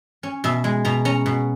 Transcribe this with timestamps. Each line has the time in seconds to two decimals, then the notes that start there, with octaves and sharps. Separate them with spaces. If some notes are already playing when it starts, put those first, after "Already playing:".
0.23 C#4
0.44 B2 E5
0.64 G#3
0.85 B2 A#5
1.05 C#4 A#5
1.26 B2